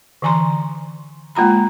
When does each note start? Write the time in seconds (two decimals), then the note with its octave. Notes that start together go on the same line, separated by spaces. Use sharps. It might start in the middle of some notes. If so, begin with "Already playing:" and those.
0.22 D3 E3 G#5 A#5 C6
1.35 G#3 A#3 F4 A#5 B5